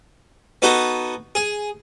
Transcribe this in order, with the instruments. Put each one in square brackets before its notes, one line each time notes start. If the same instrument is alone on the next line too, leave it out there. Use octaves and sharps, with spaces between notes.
[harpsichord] B3 D#4 F#4 A4
G#4